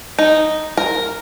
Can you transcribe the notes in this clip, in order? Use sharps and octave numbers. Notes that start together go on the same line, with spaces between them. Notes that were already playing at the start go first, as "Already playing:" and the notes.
D#4
A#4